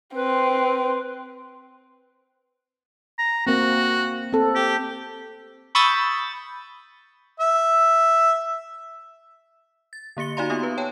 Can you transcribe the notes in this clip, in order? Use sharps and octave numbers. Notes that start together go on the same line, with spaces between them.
C4 B4
A#5
A#3 C4 F#4
C4 A4
G4
B5 C#6 D#6 E6 G6 A6
E5
A6
D3 A#3 G4 C#7 G7
D#4 F#4 D5 F5 A#5 C6
B3 D#4 F4 G4 D#6
B4
C#5 G5 A5